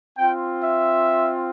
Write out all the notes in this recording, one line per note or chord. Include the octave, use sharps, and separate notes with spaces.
C4 F4 G5
E5